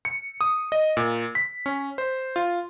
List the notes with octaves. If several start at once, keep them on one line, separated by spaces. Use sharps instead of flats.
C#7
D#6
D#5
A#2
B6
C#4
C5
F4